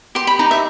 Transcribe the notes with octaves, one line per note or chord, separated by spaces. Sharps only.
G4 C6
B5
D#4 A#5
E5